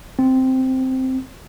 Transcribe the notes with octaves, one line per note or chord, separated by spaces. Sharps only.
C4